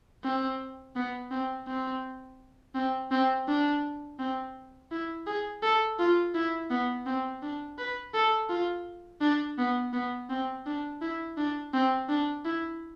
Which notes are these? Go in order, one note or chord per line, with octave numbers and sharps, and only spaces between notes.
C4
B3
C4
C4
C4
C4
D4
C4
E4
G#4
A4
F4
E4
B3
C4
D4
B4
A4
F4
D4
B3
B3
C4
D4
E4
D4
C4
D4
E4